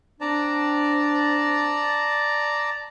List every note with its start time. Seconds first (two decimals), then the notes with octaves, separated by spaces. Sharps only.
0.21 C4 D4 D5 A5 A#5